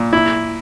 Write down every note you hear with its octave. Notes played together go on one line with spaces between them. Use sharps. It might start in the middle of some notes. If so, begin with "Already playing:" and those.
Already playing: A#2
E4